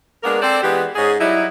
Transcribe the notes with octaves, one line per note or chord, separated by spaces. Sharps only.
G#3 A#3 B3 D4 A#4
C4 A4 C5 D5
E3 G#3 B3 D4 G4
G#2 C#4 G#4
F#3 G3 D#4 E4